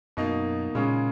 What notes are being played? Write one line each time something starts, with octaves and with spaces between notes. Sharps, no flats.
F#2 B2 A#3 D#4
A#2 C#3 G#3 C#4